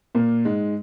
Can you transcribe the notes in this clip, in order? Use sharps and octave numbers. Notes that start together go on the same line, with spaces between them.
A#2 A#3
G#2 G#3